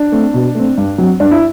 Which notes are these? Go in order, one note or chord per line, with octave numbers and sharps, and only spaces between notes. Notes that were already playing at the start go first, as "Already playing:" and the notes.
Already playing: D4
A3 C4
B2
A3 C4
G2
F#3 C4
G2 D4
E4